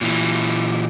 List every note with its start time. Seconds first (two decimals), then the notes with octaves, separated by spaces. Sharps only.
0.01 A#2 E3